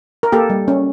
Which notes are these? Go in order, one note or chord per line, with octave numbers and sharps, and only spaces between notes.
A#4
A#3 G4 A4
G3
C#4